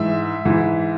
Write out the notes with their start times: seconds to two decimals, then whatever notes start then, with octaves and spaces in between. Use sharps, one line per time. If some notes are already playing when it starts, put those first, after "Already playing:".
Already playing: G#2 E3 E5
0.45 G#2 E3